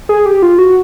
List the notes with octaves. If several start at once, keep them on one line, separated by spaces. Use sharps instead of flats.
G#4
G4
F4
F#4